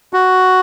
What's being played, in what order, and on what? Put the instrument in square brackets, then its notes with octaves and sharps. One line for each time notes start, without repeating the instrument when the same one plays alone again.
[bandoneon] F#4